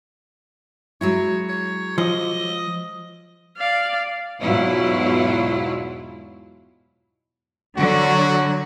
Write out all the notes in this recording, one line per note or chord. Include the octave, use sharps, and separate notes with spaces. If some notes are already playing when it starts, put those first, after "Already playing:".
F#3 G#3 E4 C#5
C#5
F3 D#5
D5 F5
E2 G#2 B2 F#3 E4 F4
D3 F#3 F#4